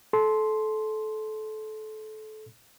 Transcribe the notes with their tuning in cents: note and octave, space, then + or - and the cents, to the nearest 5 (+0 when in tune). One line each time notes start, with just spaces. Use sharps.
A4 -25 C6 +0